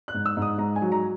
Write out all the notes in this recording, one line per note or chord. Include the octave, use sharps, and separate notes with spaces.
F#6
G#2
E6
G#2
D#6
G#2 A#5
G#5
F#3
A#5